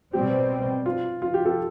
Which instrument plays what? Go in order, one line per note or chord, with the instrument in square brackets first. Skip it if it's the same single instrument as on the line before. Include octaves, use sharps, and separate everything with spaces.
[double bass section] B2 G3 C4 [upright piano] G4
[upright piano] F4
F4
G4
A4